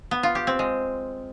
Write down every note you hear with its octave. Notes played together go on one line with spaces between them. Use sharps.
B3
F4
G4
C4
G#3